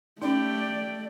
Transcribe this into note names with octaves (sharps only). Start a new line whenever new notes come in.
A3 C#4 D#4 G4 D5 G5